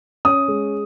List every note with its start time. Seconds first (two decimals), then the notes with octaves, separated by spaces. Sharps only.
0.25 C#4 D#6
0.48 G#3